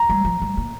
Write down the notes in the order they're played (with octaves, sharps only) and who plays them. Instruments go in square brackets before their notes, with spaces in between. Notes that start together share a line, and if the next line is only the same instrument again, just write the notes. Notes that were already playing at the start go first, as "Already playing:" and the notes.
Already playing: [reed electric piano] A#5
[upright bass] G3
F3
G3
A#3